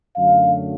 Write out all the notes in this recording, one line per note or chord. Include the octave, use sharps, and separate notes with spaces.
F#2 D3 F#3 A3 D4 F5